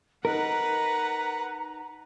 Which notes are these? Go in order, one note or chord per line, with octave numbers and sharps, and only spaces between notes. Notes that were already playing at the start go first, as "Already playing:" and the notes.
D#4 A#4 B4 F#5 A#5